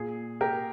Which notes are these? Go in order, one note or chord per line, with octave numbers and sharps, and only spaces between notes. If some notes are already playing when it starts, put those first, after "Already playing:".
Already playing: A#2 G#4
G4 A#4